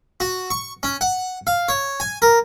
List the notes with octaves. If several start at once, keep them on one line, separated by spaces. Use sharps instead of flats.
F#4
C#6
C#4
F#5
F5
C#5
G#5
A#4